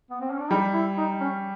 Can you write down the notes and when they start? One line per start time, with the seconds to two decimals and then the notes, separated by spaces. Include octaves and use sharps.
0.11 B3
0.20 C4
0.30 C#4
0.40 D4
0.50 G3 D#4
0.74 E4
0.98 D#4
1.20 C#4